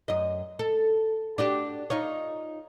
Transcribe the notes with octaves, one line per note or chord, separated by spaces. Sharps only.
F#2 D#5
A4
D4 F#4 G4
D#4 F4 C#5